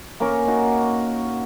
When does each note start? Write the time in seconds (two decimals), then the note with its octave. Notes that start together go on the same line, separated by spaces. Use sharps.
0.20 A#3 C#4 A#4 C#5
0.48 D#4 F#4